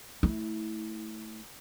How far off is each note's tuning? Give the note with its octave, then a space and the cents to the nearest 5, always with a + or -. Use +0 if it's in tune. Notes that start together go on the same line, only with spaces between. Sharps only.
A3 +0 E4 -25